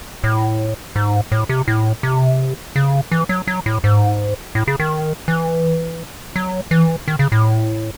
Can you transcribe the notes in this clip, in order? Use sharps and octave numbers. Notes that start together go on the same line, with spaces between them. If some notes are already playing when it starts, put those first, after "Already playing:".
A2
G#2
A2
C3
A2
C3
C#3
E3
F#3
F#3
A2
G#2
A2
C#3
D#3
E3
F#3
E3
D#3
C#3
A2